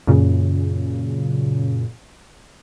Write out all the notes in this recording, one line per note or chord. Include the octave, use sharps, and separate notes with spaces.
F#2 A#2 C#3